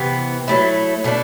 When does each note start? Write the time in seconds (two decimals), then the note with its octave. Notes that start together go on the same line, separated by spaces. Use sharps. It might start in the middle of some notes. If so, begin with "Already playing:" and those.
Already playing: C3 E3 B3
0.48 F#3 A3 E4
1.04 B2 A3 D4